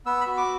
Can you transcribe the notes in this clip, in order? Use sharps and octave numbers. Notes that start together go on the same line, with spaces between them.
B3 E6
B5
F#4
D6